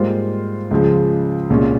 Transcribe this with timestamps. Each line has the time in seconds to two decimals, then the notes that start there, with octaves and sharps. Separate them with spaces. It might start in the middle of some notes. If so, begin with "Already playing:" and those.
Already playing: G#2 G3 A#3 F4 C5
0.71 C#2 C#3 F3 G#3
1.50 C2 A#2 G#3 C#4